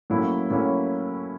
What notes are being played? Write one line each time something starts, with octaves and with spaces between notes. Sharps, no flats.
A2 F#3 A#3 C#4 E4
A2 F#3 A#3 C#4 E4